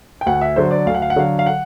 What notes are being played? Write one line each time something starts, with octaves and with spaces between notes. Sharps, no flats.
G5
D2 F#5
E5
D3 F#3 C5
D5
D2 F5
F#5
F5
F#5
D3 F#3 F5
F5
F#5